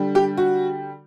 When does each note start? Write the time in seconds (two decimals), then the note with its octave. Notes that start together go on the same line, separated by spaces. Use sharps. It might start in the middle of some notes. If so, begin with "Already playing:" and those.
Already playing: D3 G3
0.15 G4
0.37 F#4